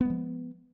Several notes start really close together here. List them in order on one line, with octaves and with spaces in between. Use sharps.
B3 G#3 F3